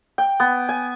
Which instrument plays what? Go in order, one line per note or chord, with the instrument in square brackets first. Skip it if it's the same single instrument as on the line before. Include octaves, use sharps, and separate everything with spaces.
[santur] G5
B3
G#5